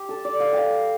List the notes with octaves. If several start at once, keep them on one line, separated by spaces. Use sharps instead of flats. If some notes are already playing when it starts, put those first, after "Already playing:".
Already playing: G4
A4
D5
F5
F5 G5